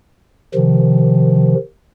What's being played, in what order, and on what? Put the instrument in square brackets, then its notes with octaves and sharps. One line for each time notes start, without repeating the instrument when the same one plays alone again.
[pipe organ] C3 D#3 F3